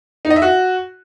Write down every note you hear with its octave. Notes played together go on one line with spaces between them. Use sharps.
D#4
D#5
E5
F#4